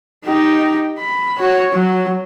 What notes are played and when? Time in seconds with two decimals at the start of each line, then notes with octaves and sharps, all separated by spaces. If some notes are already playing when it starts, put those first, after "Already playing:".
0.24 D#4 G4
0.99 B5
1.39 F#4 C#5
1.72 F#3